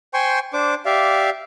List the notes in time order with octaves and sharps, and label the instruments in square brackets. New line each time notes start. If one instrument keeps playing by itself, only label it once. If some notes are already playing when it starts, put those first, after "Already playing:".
[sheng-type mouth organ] C5 G5 G#5 C6 C#6
D4 C5 D6
G4 D5 E5 F5